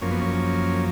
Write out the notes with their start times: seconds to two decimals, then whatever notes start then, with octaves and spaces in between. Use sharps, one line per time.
0.02 F#2 F3 A#3 C#4
0.11 B3
0.21 C#4